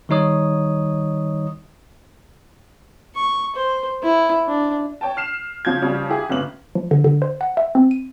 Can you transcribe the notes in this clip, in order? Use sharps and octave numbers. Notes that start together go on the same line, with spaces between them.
D#3 G3 D#4 C#5 D#6
C#6
C5
E4
D4
C#5 G5 A5
F6 C7 E7
C#3 F3 G6 G#6
C#3 F3 G3
E4 G4 G#4
G1 A2 C#3 F#7
F3
D3
D3
C5
F#5
E5
C4
D#7